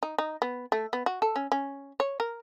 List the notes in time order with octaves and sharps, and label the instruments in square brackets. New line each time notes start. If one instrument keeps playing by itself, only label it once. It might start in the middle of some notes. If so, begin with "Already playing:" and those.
[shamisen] D#4
D#4
B3
A3
B3
F#4
A4
C#4
C#4
C#5
A#4